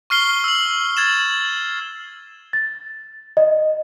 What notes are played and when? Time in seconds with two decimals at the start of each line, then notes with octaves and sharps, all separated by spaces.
0.10 C#6 F6 C7 G7
0.44 E6 F#7
0.97 G#6 A6 E7
2.53 A6
3.37 D#5